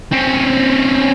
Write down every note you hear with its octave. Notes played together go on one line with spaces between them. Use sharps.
C4 C#4